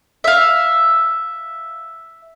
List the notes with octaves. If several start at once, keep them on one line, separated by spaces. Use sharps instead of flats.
E5 F5